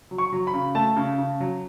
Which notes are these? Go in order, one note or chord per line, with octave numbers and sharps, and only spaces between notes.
F#3
C#6
F#3
B5
C#3
A3 A5
C#3
C#3
F#3